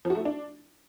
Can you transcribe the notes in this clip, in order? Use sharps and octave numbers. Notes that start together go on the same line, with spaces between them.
F3
F#4
A3
E4
D4